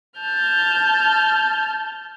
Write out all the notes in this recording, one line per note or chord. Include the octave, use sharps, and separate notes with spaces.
A5 F6 G6